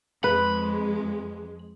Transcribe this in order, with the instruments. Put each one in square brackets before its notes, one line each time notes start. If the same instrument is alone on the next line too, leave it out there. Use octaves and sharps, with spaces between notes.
[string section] F2 G#3 [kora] B4 [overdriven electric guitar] B5